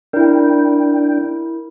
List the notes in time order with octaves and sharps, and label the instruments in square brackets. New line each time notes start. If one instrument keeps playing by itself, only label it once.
[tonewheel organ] D4 G5 [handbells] E4 A#4